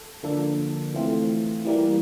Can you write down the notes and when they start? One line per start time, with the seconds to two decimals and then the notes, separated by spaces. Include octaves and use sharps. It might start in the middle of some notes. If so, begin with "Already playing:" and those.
Already playing: A4
0.23 D3 F3 A#3 D4 A4
0.94 E3 A3 C4 F4
1.65 E3 G3 A#3